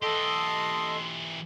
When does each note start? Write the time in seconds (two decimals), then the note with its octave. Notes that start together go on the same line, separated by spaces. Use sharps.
0.02 E3 G4 A4 D#5 C6